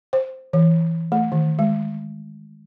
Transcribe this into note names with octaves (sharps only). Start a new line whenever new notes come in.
C5
E3
A3
D#3
G#3